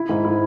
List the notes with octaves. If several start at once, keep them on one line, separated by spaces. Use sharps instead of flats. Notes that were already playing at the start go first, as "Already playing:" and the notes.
Already playing: E4
G#2
E4